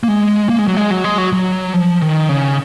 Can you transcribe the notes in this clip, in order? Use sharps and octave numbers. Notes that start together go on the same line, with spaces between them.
A#3
G#3
A#3
G#3
F#3
G#3
F#3
G#3
F#3
F#3
F3
D#3
C#3